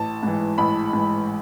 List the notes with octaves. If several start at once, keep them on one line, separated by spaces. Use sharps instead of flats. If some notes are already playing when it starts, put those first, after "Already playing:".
Already playing: A1 A5
G#2 E3
A1 B5
G#2 E3